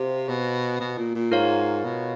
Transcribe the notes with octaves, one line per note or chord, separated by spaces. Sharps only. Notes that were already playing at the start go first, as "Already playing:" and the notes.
Already playing: C3 G4 C5 F5
B2
B2
A#2
A#2
G#2 F4 A#4 C#5 F5
B2